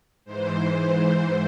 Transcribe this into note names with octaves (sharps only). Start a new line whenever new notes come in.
G#2 E3 C5
C5